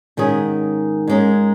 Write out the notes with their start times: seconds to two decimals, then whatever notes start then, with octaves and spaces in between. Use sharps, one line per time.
0.17 G#2 D#3 C#4 G#4
1.07 G#2 G#3 C#4 A#4